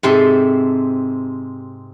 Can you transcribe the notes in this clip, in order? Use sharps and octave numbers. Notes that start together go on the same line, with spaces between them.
G#2 C3 C4 A4